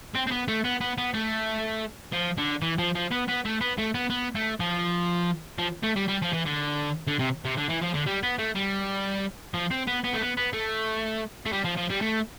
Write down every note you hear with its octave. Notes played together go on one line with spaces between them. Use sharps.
C4
C4
B3
A3
B3
B3
B3
A3
F3
D3
E3
F3
F3
B3
B3
A3
B3
A3
B3
B3
A3
F3
F3
A3
G3
G3
F3
E3
D3
D3
C3
C3
D3
E3
F3
D3
G3
B3
A3
G3
F3
C4
B3
B3
A3
B3
B3
A3
A3
G3
F3
F3
G3
A3